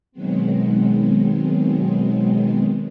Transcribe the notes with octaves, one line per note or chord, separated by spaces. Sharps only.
B2 D#3 F#3 G#3 B3 C4